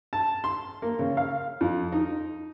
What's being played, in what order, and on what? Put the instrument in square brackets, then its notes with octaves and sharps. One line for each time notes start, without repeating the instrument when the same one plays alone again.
[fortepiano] A5
C6
A#3
C#3
F5
F2
D#4